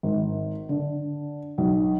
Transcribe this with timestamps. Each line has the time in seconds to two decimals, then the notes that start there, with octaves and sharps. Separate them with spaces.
0.03 G#1
0.69 D3
1.58 B1